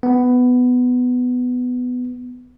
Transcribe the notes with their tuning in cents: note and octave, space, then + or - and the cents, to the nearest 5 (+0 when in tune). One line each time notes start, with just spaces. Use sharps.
B3 +10